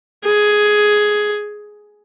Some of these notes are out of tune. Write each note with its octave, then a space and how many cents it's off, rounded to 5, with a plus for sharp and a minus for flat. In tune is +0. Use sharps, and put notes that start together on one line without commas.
G#4 +10